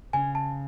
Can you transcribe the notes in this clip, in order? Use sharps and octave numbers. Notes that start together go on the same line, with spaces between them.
C#3 G#5
A5